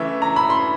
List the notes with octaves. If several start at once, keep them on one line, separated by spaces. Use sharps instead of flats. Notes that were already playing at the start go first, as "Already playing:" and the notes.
Already playing: C#3 E3 A3 E5
A#5
B5
C6